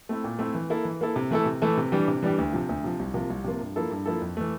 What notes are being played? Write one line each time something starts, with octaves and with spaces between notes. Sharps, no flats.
A3 C4 E4
A#2
A3 C4 E4
E3
A#3 E4 A4
E3
A#3 E4 A4
C3
E3 A3 E4 A4
C3
E3 A3 E4 A4
C3
E3 G3 D4 G4
C3
E3 G3 D4 G4
D2
C3 F3
D2
C3 F3
C2
C3 F3 A#3 F4
C2
C3 F3 A#3 F4
G2
F3 A#3 E4 A4
G2
F3 A#3 E4 A4
F2
E3 A3